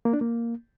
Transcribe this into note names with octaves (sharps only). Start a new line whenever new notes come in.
A#3
D4
A#3